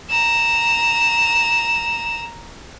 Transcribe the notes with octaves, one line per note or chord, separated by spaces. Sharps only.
A#5 E7